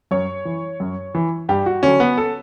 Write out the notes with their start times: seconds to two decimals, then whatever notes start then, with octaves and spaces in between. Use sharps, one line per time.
0.11 F#2 C#5
0.45 E3
0.80 F#2
1.15 E3
1.49 G2 G4
1.66 F#4
1.83 D3 F#3 C#4
2.00 B3
2.18 A4